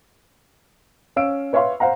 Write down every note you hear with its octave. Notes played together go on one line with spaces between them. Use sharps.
C#4 F5 E6 D7
B4 C#5 E5 F5 C6
C5 F5 F#5 A#5